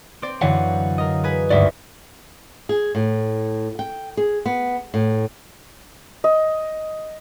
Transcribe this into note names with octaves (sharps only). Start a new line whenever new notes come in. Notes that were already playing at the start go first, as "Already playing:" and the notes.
C4 C5 D5
F#2 D3 E3 C#5 F5 F#5
A#4 D#5
G#4 B4 G#5
G#1 D2 G2 D5 E5
G#4
A2
G5
G#4
B3
A2
D#5